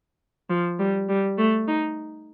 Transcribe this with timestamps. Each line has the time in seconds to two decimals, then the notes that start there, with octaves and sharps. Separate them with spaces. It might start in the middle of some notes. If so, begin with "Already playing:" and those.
0.50 F3
0.79 G3
1.09 G3
1.38 A3
1.67 D#4